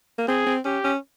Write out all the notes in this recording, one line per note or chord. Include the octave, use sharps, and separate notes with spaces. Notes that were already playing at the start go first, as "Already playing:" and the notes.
A#3
C4 G#4
C4
C#4 G4
C#4